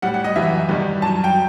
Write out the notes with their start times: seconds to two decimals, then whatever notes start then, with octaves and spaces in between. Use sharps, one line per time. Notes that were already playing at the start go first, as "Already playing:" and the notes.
0.02 A2 G3 F#5
0.14 F#5
0.24 D#5
0.36 F#2 E3 G3 E5
0.69 G2 D#3 G3
1.02 F#2 A5
1.05 F#3
1.24 G5